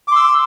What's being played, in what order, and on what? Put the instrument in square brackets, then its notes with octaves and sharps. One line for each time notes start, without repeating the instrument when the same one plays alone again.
[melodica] D6
C6
E6